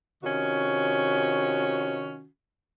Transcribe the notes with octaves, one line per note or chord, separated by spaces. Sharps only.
C3 D#3 C#4 F4 F#4